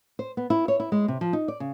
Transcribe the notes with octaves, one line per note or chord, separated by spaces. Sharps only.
C5
B3
E4
C#5
E4
G#3
C3
F3
D#4
D5
C#3